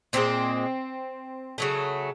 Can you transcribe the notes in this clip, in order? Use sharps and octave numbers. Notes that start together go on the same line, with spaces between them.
A#2 F3 G#3 C4
C#3 F#3 A3